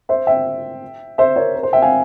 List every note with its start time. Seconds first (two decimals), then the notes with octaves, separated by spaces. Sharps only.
0.09 C5 E5
0.27 E5 G5
1.18 C5 E5
1.36 A#4 C#5
1.55 A#4
1.63 C5
1.73 E5 G5
1.82 F5 G#5